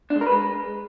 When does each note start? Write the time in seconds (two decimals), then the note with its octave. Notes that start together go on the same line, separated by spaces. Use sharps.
0.10 D4
0.16 G#3
0.21 A#4
0.27 B4
0.32 G#3